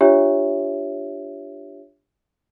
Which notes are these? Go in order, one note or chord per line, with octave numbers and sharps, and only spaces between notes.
D4 F4 G4 C#5 E5